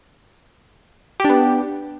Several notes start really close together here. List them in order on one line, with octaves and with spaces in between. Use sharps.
G4 D4 B3